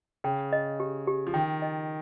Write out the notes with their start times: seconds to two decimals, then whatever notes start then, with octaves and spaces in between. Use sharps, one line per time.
0.24 C#3 G5
0.53 D#5
0.80 G4
1.07 G4
1.27 F3
1.34 D#3 G5
1.62 D#5